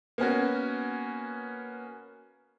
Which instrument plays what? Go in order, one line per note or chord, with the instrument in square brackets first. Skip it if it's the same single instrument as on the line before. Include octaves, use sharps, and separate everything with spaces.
[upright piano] A#3 B3 C#4 F#4